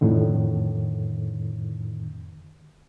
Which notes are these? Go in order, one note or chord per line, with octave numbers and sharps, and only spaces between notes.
F2 A2 D3 D#3